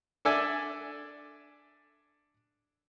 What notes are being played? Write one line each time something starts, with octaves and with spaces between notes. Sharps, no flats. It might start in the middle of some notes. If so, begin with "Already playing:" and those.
D4 A4 D5 E5 G#5